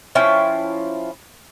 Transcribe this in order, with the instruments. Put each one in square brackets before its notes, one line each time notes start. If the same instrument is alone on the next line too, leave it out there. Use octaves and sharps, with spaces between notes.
[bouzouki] F3 C#4 E4 G5